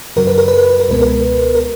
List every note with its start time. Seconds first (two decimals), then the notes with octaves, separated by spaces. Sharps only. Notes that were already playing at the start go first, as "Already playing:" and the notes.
0.16 F#2 C#3 F#3 A#4
0.27 B4
0.38 A#4
0.48 B4
0.59 A#4
0.70 B4
0.80 A#4
0.88 C#2 B2 G#3 B3 B4
1.01 A#4
1.55 A#4